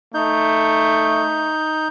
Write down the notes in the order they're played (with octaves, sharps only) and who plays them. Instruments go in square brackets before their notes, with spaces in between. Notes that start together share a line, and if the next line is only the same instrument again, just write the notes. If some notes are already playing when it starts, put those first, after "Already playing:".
[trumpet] A3 [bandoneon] D#4 G6